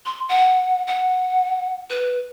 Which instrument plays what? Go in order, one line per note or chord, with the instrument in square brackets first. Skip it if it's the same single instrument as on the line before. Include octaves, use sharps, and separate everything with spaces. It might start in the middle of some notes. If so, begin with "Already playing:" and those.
[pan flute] C6
F#5
F#5
B4